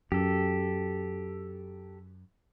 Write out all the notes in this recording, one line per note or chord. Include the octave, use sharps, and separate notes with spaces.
F#2 G4 A4